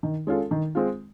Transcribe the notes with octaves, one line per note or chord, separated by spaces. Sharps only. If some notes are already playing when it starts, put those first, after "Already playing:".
D#3
G#3 C#4 F4 A4
D#3
G#3 C4 F4